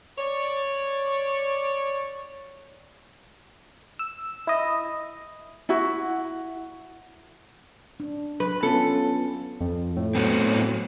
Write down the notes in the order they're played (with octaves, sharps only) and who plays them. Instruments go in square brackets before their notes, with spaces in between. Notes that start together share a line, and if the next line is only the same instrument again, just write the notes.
[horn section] C#5 D5
[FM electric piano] E6
E4 D#5
[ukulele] E4 F#4
[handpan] D4
[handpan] F#3 [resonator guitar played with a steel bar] B4
[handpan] B3 C#4 F4 [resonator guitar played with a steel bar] A4
[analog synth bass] F2
A2
[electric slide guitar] F#3 B3 C4